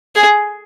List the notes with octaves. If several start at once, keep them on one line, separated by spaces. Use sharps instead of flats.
G#4